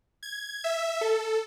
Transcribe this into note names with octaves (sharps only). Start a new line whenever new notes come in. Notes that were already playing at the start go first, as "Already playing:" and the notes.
G#6
E5
A4